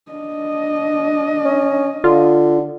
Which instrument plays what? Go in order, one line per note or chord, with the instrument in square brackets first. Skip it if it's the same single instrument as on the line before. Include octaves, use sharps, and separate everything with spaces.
[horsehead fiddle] D4 D#5
[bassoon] C#4
[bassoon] D3 [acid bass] F4